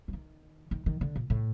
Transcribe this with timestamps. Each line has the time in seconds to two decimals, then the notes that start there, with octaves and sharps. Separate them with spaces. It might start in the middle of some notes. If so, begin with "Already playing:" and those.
0.08 F#3
0.13 D#3
0.71 D#3
0.86 D#3
1.01 D3
1.16 A#2
1.30 A2